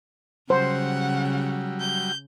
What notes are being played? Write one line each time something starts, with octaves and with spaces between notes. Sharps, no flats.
C#3 F#3 G3 C5 F#5
G6